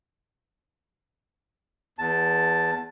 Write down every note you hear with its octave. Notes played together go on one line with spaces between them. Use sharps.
E2 A5